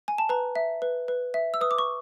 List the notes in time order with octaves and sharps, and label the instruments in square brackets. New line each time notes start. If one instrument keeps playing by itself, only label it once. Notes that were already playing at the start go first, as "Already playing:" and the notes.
[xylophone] G#5
A5
B4 A#5
E5
B4
B4
E5
E6
B4 D#6
D6
C#6